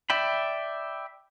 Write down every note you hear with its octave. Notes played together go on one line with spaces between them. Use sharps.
D5 E5 G5 B5